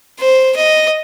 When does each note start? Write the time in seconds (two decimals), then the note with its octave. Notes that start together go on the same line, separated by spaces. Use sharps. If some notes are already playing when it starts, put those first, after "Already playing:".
0.20 C5
0.56 D#5